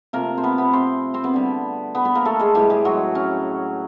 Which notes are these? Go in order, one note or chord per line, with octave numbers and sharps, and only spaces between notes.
C3 F3 A3 A#3 A#4
C5
B3 B4
B3 B4
C4 C5
C4 C5
B3 B4
D3 G3
B3 B4
B3 B4
A#3 A#4
A3 A4
G#3 G#4
A2 E3 G3 G#3 G4
G#3 G#4
F#3 F#4
C#4